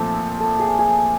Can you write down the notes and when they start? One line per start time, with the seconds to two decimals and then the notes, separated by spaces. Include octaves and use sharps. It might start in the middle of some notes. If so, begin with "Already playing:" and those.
Already playing: A#2 F3 A3 C4 A4
0.40 A4
0.59 G#4
0.79 G#4